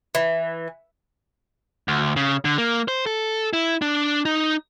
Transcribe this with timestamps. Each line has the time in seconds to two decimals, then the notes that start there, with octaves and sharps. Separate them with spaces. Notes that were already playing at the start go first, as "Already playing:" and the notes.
0.15 E3
1.88 D2
2.16 C#3
2.45 D3
2.58 A#3
2.88 C5
3.06 A4
3.53 E4
3.82 D4
4.25 D#4